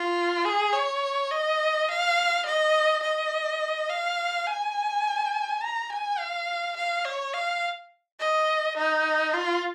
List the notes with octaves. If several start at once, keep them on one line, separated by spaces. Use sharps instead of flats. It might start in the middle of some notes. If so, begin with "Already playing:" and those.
Already playing: F4
G#4
C#5
D#5
F5
D#5
D#5
F5
G#5
A#5
G#5
F5
F5
C#5
F5
D#5
D#4
F4